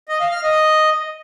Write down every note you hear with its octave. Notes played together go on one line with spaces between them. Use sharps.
D#5
F5
F6
D#5